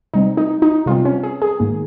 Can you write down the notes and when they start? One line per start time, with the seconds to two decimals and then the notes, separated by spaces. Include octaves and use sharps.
0.14 C3 G3 C4 D#4
0.37 D#4
0.62 D#4
0.86 C3 G3 C4 F4
1.05 C#4
1.23 G#4
1.42 G#4
1.60 G#2 D#3 A#3